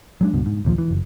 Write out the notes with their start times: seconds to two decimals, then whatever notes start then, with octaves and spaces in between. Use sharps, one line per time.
0.21 F#3 G#3 D4
0.33 C#2 G2 B2
0.46 G#2
0.65 A#1 D#2 C#3 F3
0.78 E3
0.91 F#1